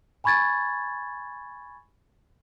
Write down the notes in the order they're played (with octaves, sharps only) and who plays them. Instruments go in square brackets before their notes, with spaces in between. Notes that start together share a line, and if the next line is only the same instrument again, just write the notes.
[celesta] G#5 B5 C#6 G#6 A6